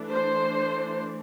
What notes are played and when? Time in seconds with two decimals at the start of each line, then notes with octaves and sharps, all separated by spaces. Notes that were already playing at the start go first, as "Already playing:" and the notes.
Already playing: E3 A3 D4
0.09 C5